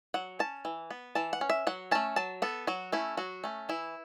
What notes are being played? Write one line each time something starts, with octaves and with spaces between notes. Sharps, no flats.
F#3 F#5
C#4 A5
E3
B3
E3 A5
F#5
C#4
E5
F#3 F#5
A3 C#4 A5
F#3 A5
B3 A4
F#3 F#4
A3 C#4 E4
F#3 F#4
A3 C#4
E3 E4